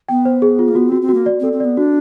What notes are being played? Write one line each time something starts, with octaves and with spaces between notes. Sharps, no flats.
B3 G5
C5
G#4
F4
A#3
B3 F#4
C4 F#4
C4
A#3 F#4
D5
C4
A4
C4
B3 D5
D4 F#4